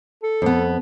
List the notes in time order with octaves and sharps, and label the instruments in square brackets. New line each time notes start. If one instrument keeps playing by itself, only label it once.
[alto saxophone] A4
[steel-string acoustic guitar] F2 B3